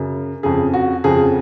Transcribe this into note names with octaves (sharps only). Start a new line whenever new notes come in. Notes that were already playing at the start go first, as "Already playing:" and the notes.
Already playing: F#2 C#3
F2 C#3 G#4
F#4
F2 C#3 G#4